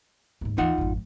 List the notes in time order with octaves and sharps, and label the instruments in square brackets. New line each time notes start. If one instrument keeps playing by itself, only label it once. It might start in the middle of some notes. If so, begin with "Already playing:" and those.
[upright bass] D#2 G#2
[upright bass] D#2 E3 [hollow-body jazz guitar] D#4 F4 F#5
[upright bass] G#1 F2